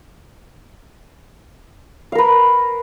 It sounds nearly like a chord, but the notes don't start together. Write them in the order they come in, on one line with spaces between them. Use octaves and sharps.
F5 A#4 B4